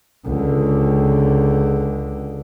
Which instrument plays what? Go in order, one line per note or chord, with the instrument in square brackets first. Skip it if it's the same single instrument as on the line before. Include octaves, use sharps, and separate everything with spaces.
[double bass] C#2 D3